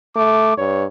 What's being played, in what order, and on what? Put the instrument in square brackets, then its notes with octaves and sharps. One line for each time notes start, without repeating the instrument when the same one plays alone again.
[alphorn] A3 [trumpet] D6
[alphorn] G2 [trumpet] C#5